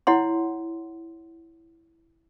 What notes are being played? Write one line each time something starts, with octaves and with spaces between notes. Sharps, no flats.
E4 C#5 F#5 C6